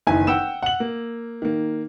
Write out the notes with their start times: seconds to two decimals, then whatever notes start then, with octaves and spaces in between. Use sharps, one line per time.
0.07 F#1 D#3 E3 G#5
0.27 F#5 G5 E6 E7
0.63 F#5 F#7
0.80 A#3
1.42 D#3 A#3